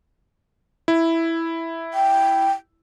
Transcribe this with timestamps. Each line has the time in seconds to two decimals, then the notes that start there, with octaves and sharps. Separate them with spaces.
0.88 E4
1.94 G5